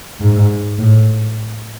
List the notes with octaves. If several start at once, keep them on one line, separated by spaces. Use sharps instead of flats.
G#2
A2